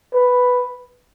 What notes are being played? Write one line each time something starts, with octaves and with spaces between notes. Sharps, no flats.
B4